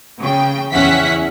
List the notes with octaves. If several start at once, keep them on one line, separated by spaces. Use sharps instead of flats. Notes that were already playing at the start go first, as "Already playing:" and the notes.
C#3 G5
E2 C#4 E5 F#5 B6